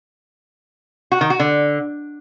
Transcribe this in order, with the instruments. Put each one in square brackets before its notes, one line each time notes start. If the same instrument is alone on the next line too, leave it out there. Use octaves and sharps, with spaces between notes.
[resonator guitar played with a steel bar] F#4
D#3
F#4
D3